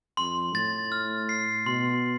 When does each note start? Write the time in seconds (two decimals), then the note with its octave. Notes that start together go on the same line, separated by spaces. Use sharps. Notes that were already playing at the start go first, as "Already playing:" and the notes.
0.17 F2 C6
0.54 A2 A6
0.92 F6
1.29 C7
1.66 B2 C6